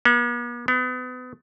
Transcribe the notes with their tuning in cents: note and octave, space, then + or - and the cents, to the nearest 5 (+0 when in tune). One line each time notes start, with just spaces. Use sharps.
B3 -45
B3 +35